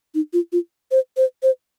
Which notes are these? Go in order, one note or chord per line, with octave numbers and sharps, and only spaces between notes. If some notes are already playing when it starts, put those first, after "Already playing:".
D#4
F4
F4
C5
C5
C5